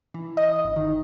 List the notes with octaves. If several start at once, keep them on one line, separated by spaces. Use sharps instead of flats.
E3
D#5
G1
D#3